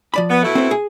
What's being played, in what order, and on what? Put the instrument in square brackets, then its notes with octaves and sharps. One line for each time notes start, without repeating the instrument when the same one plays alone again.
[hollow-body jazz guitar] F3 D5 B5
[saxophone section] B3
B2 A3 E4
[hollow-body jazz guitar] C4 C5
G#4